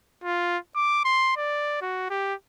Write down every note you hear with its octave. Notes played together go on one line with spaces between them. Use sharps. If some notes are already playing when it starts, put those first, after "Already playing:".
F4
D6
C6
D5
F#4
G4